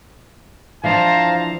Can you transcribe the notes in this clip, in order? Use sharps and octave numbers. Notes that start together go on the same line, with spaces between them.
E3 F3 D4 C5 F5 A5 A#5